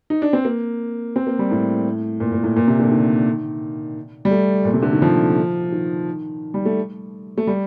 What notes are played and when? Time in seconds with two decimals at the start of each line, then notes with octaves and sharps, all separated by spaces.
0.10 D#4
0.22 D4
0.33 C4
0.45 A#3
1.16 C4
1.27 A#3
1.39 G3
1.51 A2
2.20 A#2
2.32 A#2
2.44 A2
2.57 A#2
2.68 C3
2.80 D3
2.92 D#3
4.25 G3
4.31 A3
4.64 A#2
4.74 C3
4.83 D3
4.93 D#3
5.02 F3
5.72 D#3
6.54 G3
6.65 A3
7.38 A3
7.47 G3